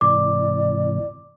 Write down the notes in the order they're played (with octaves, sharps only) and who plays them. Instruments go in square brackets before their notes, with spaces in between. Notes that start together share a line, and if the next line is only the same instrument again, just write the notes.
[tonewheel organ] G#2 C3 E3 [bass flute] D5 [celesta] D6